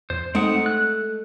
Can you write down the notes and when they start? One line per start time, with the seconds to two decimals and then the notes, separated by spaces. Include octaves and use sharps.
0.10 F2 C5
0.35 G#3 A3 C4 D#4 F#5
0.66 F#6